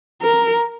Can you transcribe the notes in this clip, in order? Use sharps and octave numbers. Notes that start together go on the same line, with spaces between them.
A#4